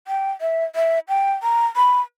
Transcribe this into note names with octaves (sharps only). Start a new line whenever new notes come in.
G5
E5
E5
G5
A#5
B5